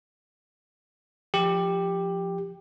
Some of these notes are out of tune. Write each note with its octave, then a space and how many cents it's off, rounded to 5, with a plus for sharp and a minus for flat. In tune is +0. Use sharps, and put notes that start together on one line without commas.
F3 +0 G4 +10